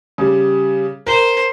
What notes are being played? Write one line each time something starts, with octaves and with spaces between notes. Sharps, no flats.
C#3 G3
A#4 C5